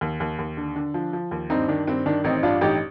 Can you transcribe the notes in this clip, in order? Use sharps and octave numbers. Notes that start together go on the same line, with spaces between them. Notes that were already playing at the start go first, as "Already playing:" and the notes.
D#2
D#2
D#2
D3
D3
F3
F3
D#2
G2 C4 D#4
D#3 D4
G2 C4
D#3 D4
A1 C4 D#4
G2 D4 F4
A1 D#4 G4